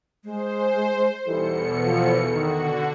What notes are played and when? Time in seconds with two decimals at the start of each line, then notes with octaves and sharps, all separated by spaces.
0.24 G#3 C5
1.26 E2 B2 E3 G3 D#4 A4 C#7
1.84 F3
2.32 D3 D#3 F#4